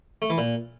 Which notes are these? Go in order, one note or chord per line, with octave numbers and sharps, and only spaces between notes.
A3
E3
A#2